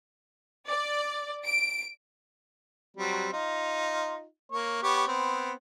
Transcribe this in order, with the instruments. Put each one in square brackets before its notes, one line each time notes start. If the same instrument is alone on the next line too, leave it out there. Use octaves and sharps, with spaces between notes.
[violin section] D5
D7
[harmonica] F#3 G3 C4
D#4 F4
A#3 C#5
B3 G4 C#5
B3 C4